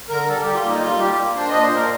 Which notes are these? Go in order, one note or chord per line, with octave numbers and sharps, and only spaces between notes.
D3 A#4
G3 A4
G3 G4
F4
A#3
D#4
G3 F4
G3 G4
A#3
D4 C5
A#2 D#5
C5
A#2 A#4